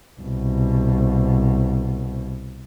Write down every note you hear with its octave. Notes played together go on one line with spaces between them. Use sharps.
C2 B2